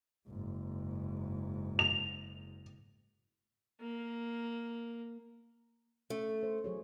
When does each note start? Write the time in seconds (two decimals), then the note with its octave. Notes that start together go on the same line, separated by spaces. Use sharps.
0.27 F#1 G#2
1.79 F7
3.81 A#3
6.10 A3 C#4
6.43 C5
6.64 F#3 G#4 C#5